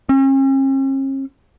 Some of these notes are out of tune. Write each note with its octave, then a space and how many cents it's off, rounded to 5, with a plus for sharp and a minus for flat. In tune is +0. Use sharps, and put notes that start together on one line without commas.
C#4 -45